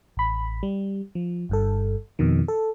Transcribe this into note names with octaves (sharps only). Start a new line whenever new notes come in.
A1 B5
G3
F3
G1 G2 A4
F2 B2 D#3
A4